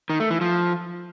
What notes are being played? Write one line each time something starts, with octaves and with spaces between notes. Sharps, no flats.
D#3
A3
E3
F3